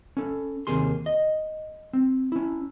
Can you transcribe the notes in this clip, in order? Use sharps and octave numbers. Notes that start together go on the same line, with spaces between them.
C#4 A4
D#2 C3 A#3 G#4 C6
D#5
C4
C#4 E4